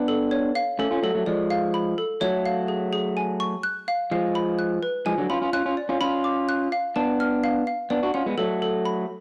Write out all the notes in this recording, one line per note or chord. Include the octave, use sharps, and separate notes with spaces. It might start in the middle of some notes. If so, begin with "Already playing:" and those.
Already playing: B3 D4
A4
C#5
F5
A3 C#4 A4
C#4 F4
F#3 A3 A4
F#3 A3
F3 G#3 D5
F5
B5
A4
F#3 A3 C#5
F5
G#4
G#4
G#5
C#6
F#6
F5
F3 G#3 F5
B5
F#6
B4
F3 G#3 G#5
D3 F#3
C#4 F4 B5
C#4 F4
C#4 F4 F#6
C#4 F4
D5
C#4 F4
C#4 F4 B5
D6
F#6
F5
B3 D4 A5
F6
F5
F5
B3 D4 D5
D4 F#4
C#4 F4 F#5
G#3 B3
F#3 A3 A4
A4
B5